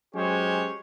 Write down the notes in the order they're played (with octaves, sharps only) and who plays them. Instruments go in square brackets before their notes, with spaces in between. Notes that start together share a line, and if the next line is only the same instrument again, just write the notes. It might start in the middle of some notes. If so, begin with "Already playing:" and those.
[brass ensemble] F#3 G#3 C#4 G4 C5 C#5